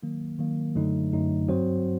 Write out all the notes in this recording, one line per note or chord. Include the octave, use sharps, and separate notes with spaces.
D#3 F#3 A#3
D#3 F#3 A#3
F#2 D3 F#3 A3 D#4
F#2 D3 F#3 A3 D#4
G2 F#3 C4 F#4 C5